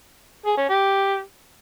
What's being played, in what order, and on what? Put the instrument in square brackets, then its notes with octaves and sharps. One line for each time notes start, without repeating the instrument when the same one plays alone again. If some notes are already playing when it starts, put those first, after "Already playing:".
[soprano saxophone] G#4
C#4
G4